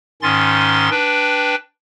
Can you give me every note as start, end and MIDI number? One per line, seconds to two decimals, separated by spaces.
0.22 0.89 44
0.22 0.89 51
0.22 0.89 61
0.22 0.89 84
0.22 0.89 93
0.90 1.55 62
0.90 1.55 71
0.90 1.55 79